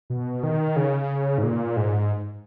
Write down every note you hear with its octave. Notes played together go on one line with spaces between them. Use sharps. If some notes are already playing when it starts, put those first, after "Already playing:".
B2
D#3
C#3
G#2
A#2
G#2